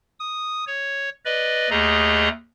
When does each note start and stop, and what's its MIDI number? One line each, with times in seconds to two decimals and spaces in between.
0.20 0.65 87
0.67 1.09 73
1.25 1.70 71
1.25 1.70 74
1.25 1.70 75
1.70 2.29 39
1.70 2.29 57
1.70 2.29 68
1.70 2.29 75
1.70 2.29 82